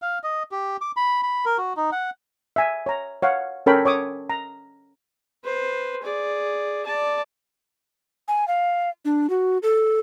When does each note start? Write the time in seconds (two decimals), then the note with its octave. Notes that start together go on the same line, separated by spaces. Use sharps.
0.02 F5
0.23 D#5
0.52 G4
0.81 D6
0.97 B5
1.23 B5
1.46 A#4
1.58 F#4
1.77 D#4
1.92 F#5
2.56 E5 G#5
2.86 C#5 A#5
3.22 C#5 F5 F#5
3.66 C#4 A4 A#4 C#5 G5 B5
3.85 C#5 D6 D#6
4.30 A#5
5.44 B4 C5
6.03 G#4 D5
6.86 D5 A5
8.28 G#5
8.48 F5
9.05 D4
9.30 F#4
9.63 A4